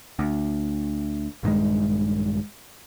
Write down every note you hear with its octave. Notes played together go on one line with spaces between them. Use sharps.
D2
A#1 G2 D#3 G#3